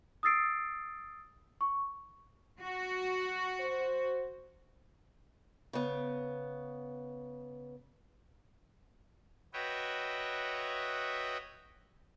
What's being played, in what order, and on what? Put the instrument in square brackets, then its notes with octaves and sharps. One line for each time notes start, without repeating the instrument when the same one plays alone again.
[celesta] D#6 E6 A6 C7 D7
C#6
[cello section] F#4
[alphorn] C5
[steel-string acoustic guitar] C#3 B3
[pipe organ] F#4 B4 C#5 D#5 E5 G5